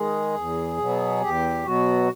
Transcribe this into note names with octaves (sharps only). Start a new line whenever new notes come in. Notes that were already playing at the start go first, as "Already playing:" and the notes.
Already playing: D#3 G#3 G#4
E2
B2 F#3 B3
E2 G4
B2 F#3 B3 F#4